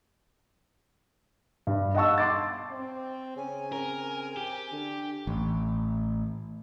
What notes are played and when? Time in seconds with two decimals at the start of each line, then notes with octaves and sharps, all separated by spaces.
1.67 G2
1.95 D#5 F5 F#5 A5 C#6 E6
2.18 C6 D6 A6
2.71 C4
3.37 C#3 C#4 G#5
3.73 C4 A#4
4.37 G4
4.72 D3
5.27 A1